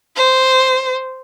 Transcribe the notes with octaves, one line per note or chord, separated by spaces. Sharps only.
C5